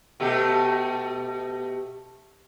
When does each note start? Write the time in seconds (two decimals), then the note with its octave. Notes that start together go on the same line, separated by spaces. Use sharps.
0.20 B2 A3 G4